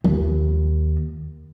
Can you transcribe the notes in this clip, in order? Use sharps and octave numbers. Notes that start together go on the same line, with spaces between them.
D#2